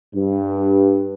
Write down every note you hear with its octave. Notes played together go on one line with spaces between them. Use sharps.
G2